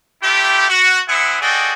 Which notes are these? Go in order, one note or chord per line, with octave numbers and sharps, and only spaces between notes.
A3 E4 F4 G4
F#4
C4 E4 G#4 E5 F#5
F#4 G#4 A4 D5 D#5 G5